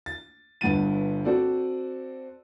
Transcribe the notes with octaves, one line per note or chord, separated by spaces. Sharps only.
A6
G1 G2 F#5 A6 D#7
C4 F#4 A4 C5 D5